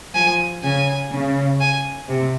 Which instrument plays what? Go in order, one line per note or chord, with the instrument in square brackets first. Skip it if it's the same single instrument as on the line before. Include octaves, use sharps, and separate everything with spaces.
[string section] F3 [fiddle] G#5
[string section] C#3 [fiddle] G#5
[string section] C#3
[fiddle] G#5
[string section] C3